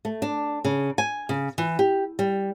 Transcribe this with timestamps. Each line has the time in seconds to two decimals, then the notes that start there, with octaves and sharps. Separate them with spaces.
0.05 A3
0.22 D4
0.65 C#3
0.98 G#5
1.29 C#3
1.58 E3
1.79 G4
2.19 G3